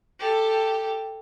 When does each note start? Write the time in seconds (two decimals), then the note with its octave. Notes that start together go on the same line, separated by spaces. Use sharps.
0.19 G4 A4